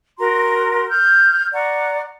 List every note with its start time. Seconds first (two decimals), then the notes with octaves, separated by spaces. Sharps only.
0.19 F#4 A#4 A#5 C6
0.89 F6 G6
1.53 D5 F#5 A#5 C#6